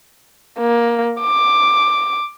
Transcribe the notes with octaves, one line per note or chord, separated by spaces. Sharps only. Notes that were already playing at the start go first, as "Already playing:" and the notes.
A#3
D6